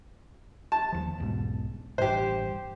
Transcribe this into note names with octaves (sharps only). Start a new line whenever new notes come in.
A5
D#2 F3
E1 B1 G#2
A1 G2 G4 C5